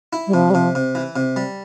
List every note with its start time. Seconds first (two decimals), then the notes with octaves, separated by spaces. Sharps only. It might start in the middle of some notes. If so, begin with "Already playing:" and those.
0.13 E4
0.27 G3
0.34 C3 F3
0.50 G3
0.54 C3 F3
0.75 C3
0.95 E3
1.16 C3
1.36 G3